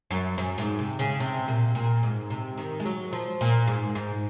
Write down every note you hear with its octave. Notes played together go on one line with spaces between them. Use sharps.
F#2
F#2
G#2
C3
C#3
C3
A#2
A#2
G#2
C3
D#3
G#3
F#3
F3
A#2
G#2
G#2